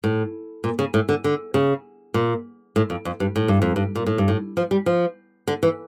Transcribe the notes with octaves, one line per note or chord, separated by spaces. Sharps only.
A2
A#2
C#3
A2
D3
D3
C#3
A#2
A2
F2
F2
G2
A2
G2
F2
G2
A#2
A2
G2
A2
F3
G3
F3
D3
E3